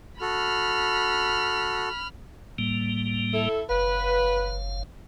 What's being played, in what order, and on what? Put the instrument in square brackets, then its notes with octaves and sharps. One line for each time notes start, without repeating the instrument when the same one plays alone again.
[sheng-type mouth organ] F#4 A4 [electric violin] B5 F6
[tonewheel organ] A2 G3 A#3
[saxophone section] E4 A4
[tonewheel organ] F#1 F5 [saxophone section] B4